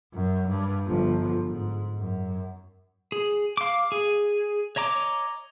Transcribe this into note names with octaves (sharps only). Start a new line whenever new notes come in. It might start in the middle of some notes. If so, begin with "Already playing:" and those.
F#2
G2
G1 F3
G#2
F#2
G#4
F5 D6
G#4
C#5 D#5 A#5 D6